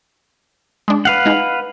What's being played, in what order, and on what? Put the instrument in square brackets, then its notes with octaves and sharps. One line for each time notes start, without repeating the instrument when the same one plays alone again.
[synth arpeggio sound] G#3 D4
[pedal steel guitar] B4 F5 F#5
[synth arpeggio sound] G#3 D#4